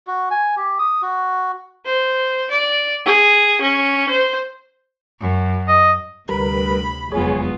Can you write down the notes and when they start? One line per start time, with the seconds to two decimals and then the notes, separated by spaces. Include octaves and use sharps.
0.07 F#4
0.31 G#5
0.57 G4
0.79 D#6
1.02 F#4
1.85 C5
2.51 D5
3.06 G#4
3.61 C#4
4.09 C5
5.21 F#2
5.68 D#5
6.29 D2 C3 G3 A#4 B4 B5
7.12 F1 E2 F#3 G#3 B3 F4 G#4 C#5